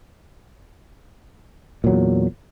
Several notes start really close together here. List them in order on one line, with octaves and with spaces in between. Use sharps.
A#2 F#3 E2